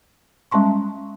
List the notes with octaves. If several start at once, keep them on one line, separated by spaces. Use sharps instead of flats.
G3 G#3 C#4 A5 C6 C#6